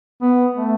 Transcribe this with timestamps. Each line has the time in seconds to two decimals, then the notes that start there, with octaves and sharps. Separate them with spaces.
0.22 B3
0.55 A3